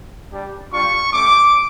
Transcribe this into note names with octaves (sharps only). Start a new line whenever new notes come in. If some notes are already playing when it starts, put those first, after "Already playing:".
G3 D4 G4
G3 D4 F4 C#6
A3 C#4 G4 D6